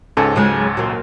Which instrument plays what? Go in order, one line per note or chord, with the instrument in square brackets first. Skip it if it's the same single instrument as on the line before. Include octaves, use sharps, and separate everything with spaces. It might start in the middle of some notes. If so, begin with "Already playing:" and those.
[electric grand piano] C#2 G#2 A4 [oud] C#4
[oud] C#3 F#3 G#3
A#2 F#3